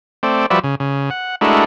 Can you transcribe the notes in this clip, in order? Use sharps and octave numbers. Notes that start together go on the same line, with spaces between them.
A3 C4 D5
F3 G3 F#4 B4 D5 E5
C#3
C#3
F#5
G#3 A3 D4 E4 F#4 A#4